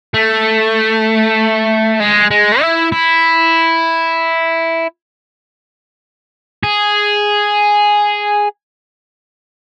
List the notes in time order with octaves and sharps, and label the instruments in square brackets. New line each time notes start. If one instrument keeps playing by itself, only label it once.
[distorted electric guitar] A3
G#3
G#3
E4
E4
G#4